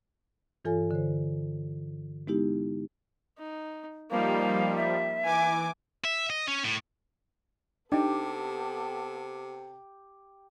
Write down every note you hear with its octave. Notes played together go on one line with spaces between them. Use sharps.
G2 E3 F4 A4 C#5 G#5
D3 C5
G#3 B3 D#4 E4 G4
D#4
F3 G3 A#3 D#4 F5
E5
E3 G#5 D6
E5
D#5
C#4
A2
C3 B3 D4 D#4 G4 A4